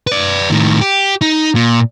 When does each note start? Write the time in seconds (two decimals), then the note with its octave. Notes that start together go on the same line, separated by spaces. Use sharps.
0.07 B4 D5
0.50 A2 D#3
0.81 G4
1.21 D#4
1.55 A#2